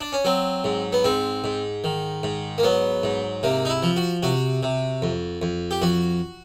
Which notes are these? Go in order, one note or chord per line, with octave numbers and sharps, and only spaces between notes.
D4
C#4
F#3 C4
G#2
B3
G#2 C4
G#2
D#3
G#2
A#3
F#3 B3
G#2
C3 A#3
D#4
E4
F3
F#4
C3 F#4
C3
F2
F2
G4
F2 F#4